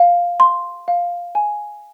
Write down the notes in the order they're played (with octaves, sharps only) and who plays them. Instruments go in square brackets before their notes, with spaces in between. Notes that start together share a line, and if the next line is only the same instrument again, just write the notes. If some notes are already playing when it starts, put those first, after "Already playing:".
Already playing: [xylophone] F5
C6
F5
G#5